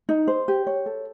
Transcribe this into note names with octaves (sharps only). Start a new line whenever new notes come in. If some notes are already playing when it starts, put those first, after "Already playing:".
D#4
C5
G4
C#5
A4